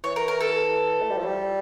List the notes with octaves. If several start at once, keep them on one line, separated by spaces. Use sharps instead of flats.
E3 C#5
A#4
A#4
A4
A3
G3
F3
G3